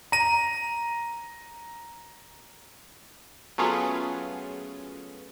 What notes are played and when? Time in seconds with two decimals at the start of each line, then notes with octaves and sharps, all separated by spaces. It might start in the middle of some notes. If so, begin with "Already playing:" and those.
0.12 A#5 D#7
3.58 F#3 A3 B3 C#4 F4 G#4